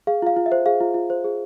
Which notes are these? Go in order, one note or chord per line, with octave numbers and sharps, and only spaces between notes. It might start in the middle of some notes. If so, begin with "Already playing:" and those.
G#4 F5
F4 F5
F4
E5
C5
G#4 F5
F4
F4
C5
G#4